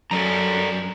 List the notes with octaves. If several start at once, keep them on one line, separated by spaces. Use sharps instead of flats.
F#2 A4 D5 A#5